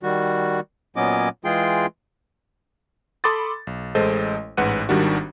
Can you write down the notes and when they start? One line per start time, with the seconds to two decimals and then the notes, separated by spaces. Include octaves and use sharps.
0.03 D#3 G3 F#4
0.96 A#2 F#3 B3 C#4 D#5 D6
1.45 E3 G#3 F4 G#4 G5 C6
3.24 A4 B5 C6 D6 D#6 A6
3.67 B1
3.95 A1 G#3 A4 C5 D#5
4.57 A1 G#2 B4 F#5 F#6 D#7
4.89 G#1 D#3 G3 D4 F#4